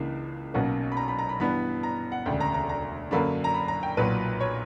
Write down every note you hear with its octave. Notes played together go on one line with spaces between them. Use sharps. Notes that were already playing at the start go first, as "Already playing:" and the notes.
Already playing: C#2 C#3 E3 A#3 D4
B1 B2 A#3 C#4 F#5
B5
A#5
B5
A#5
B5
G2 E3 B3 D4 B5
A#5
F#5
E1 D2 C#3 G5
A#5
A#5
A#5
F#2 D3 F#3 A#3 D4 B5
A#5
B5
A#5
G5
B1 A#2 F#3 B4
C#5